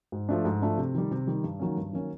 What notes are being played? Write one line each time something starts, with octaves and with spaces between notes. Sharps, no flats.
G#2
F3 A3 D4
G#2
F3 A3 D4
C3
D#3 G3
C3
D#3 G3
G2
D#3 F#3 A#3 C#4
G2
D#3 F#3 A#3 C#4